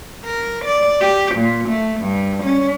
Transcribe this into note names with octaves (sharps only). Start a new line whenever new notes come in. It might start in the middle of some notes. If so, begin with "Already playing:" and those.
A#4
D5
G4
A#2
A3
G2
C#4